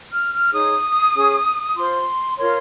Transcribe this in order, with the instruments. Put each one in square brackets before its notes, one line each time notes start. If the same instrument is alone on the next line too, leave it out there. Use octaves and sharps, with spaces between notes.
[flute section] F6
F6
D#4 G#4 C#5 D#6
C#4 G#4 C#5
F4 C5 C6
F4 A#4 C#5 C6